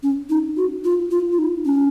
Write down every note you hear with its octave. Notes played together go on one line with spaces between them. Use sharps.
C#4
D#4
F#4
F4
F4
F4
D#4
C#4